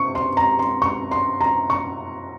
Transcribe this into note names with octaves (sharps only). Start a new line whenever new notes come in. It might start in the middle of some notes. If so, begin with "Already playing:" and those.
Already playing: C3 C#6
C6
A#5
C6
C#6
C6
A#5
C#6